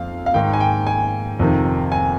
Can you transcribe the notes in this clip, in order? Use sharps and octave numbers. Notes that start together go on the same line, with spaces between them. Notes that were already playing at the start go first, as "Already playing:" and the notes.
Already playing: F2 F5
F5
G#2 D#3 G5
G#5
G5
G#5
F2 C3 D#3
G#5